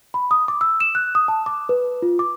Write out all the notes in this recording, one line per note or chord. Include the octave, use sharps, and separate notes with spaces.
B5
D#6
D6
E6
E7
F#6
D#6
A5
D6
B4
F4
D6